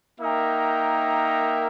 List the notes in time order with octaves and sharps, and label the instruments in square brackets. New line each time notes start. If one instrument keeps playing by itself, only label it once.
[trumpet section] A#3 D#4 A#4 E5 G5